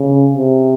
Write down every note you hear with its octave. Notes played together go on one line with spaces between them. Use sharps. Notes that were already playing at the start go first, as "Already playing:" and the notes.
Already playing: C#3
C3